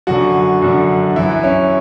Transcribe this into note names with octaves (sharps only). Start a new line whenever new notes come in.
F#2 D3 F#4
F#2 D3
F#2 E3 E4
C#4